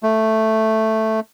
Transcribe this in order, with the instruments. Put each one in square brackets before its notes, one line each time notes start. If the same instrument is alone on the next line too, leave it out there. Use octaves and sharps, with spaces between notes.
[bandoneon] A3